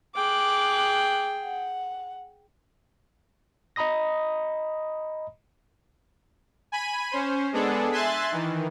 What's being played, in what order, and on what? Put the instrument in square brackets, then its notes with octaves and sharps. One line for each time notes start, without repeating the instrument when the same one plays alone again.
[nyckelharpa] G#4 G5 [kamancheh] D6 F#6
[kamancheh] F#5
[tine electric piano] D#5 A#5 B5 D#6 A#6
[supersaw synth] G#5 B5 D#7
C#4 C5
G#3 B3 D4 G#4 A4
E5 G#5 C6 F#6 A6
D#3 E3